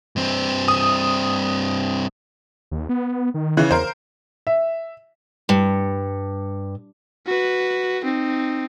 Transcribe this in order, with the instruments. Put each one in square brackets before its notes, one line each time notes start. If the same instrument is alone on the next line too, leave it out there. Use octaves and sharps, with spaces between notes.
[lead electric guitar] G2 C4
[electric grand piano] D#6
[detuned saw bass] D#2
B3
D#3
[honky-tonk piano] C#3 E3
[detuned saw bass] E2 [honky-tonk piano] A#4 C5
[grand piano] E5
[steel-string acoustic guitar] G2
[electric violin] F#4 B4
C4 D#4